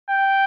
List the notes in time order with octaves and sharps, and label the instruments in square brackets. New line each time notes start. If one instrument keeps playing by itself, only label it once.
[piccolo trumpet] G5